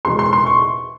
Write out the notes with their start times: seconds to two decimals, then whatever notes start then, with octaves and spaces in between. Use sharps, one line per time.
0.05 E2 B2 G#3 C6
0.19 C6
0.33 C6
0.46 C#6